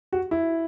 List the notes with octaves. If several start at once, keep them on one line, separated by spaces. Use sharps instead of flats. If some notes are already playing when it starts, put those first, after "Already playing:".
F#4
E4